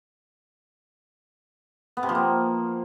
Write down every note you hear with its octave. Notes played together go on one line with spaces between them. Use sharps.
B3
C3
F3
A#3